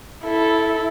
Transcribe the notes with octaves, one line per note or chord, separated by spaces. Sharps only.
E4 A4